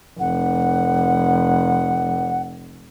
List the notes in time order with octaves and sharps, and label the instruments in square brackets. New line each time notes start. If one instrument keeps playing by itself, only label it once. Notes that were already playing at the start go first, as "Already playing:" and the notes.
[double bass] F1 [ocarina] F#5